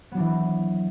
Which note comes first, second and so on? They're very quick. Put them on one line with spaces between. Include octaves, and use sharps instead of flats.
B3 F#3 D4 E3